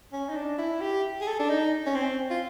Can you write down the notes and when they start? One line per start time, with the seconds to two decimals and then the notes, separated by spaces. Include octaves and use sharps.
0.13 C#4
0.29 D#4
0.36 D4
0.58 E4
0.81 G4
1.21 G#4
1.27 A4
1.39 D4
1.50 D#4
1.87 C#4
1.95 C4
2.31 F4